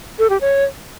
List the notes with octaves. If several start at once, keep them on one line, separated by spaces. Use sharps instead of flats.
A4
G4
C#5